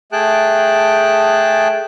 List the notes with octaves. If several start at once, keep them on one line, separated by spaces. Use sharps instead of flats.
A3 G#4 G5 A5 F#6